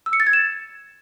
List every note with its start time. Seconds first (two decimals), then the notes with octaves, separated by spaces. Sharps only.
0.06 E6
0.13 C#7
0.20 A6
0.27 G#6
0.33 E7